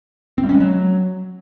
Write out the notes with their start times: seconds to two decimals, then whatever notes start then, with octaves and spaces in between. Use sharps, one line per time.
0.38 C4
0.43 G3
0.49 C#4
0.55 G#3
0.60 F#3